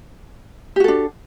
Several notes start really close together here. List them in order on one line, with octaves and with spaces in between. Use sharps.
G4 F#4 A4 D4